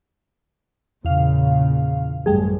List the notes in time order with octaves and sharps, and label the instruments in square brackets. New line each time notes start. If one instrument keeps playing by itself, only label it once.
[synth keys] E2 F5 [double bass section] A#2 C#3
[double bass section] A1 F#2 [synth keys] G3 A3 G#4